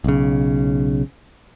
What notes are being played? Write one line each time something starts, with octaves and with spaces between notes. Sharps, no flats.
B1 C#3